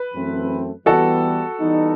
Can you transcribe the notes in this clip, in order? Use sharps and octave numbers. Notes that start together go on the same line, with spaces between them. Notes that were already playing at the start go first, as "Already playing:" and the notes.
Already playing: B4
F#2 E3 A3 C4
E3 G3 B3 F#4 A4
E3 G3 B3 D#4